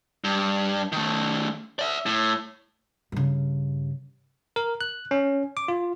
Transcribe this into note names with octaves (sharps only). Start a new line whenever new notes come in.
G2
D#3 A3
D5 E5
A2
G2 C#3
A#4
F#6
C#4
D6
F4